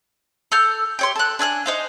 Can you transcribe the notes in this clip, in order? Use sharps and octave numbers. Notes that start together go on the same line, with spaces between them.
A4 F6 G6
G4 C#5 C6
A4 F#6
D4 G#5 F6 F#6
D#4 C5 F5